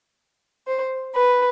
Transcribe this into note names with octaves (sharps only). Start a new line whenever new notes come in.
C5
B4